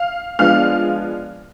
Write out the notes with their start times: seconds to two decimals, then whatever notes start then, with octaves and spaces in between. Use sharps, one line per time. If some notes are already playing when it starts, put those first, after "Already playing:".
Already playing: F5 F6
0.39 F3 G#3 B3 D4 F5 F6